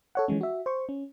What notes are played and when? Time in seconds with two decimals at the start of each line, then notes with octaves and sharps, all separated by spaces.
0.15 A4 C#5 F#5
0.28 E3 F3 G#3 C#4
0.41 F#4 E5
0.66 C5 C#6
0.89 C#4